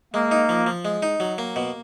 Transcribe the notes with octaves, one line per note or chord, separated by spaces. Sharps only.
G#3 A#3
D#4
F3
F3
G#3
D#4
F#3
A#3
B2